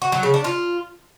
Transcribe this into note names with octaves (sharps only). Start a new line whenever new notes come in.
F#4
F#3
C#3
D4
F4